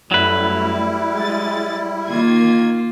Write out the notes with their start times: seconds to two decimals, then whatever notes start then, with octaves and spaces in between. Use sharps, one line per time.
0.11 F#2 F#3 G3 A3 E4 B4
1.14 G#3 A6
2.08 D#3 A#3 F4 G#6